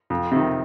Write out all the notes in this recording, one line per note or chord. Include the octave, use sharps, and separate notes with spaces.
F2
C3 D#3